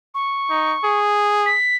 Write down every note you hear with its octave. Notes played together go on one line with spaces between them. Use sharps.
C#6
D#4
G#4
B6